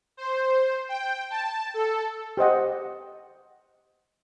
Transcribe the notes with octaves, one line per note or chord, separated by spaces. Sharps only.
C5
G5
A5
A4
G4 C5 D#5 F#5